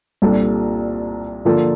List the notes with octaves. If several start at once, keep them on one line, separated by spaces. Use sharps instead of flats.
C2 A#2 G3 D4 A4
D3 F3 A#3 F4 A4